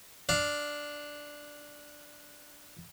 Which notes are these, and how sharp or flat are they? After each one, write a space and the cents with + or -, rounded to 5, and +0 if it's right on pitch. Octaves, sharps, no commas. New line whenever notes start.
D4 +0 F5 +0